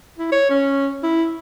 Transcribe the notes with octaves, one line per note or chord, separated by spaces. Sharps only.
E4
C#5
C#4
E4